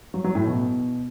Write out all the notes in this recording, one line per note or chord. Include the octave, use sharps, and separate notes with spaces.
F#3
F#3
A2
B2